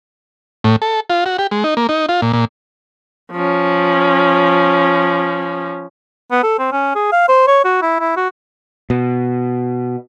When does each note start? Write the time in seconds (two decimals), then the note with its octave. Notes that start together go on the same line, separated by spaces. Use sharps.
0.64 A2
0.82 A4
1.10 F4
1.26 F#4
1.39 G4
1.51 G#3
1.64 D#4
1.77 A#3
1.89 D#4
2.09 F4
2.22 A#2
2.33 A#2
3.32 F3 C#4
6.31 B3
6.43 A4
6.59 C4
6.72 C#4
6.95 G#4
7.12 F5
7.28 C5
7.47 C#5
7.65 F#4
7.82 E4
8.00 E4
8.17 F#4
8.90 B2